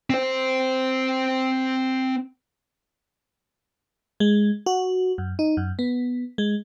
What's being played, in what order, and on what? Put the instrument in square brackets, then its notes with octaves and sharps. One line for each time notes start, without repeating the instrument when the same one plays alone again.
[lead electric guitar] C4 C5
[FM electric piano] G#3
F#4
F#2
D#4
F#2
B3
G#3